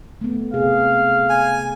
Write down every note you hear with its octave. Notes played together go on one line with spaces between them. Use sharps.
A3 B3
C3 G#4 F5
G#5